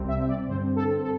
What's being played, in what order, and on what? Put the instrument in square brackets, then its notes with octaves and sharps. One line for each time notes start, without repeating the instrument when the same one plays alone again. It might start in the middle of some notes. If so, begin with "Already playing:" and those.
Already playing: [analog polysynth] C2 C3 G3 C4
E5
D5
G2 D3 C4 C5
A4
A4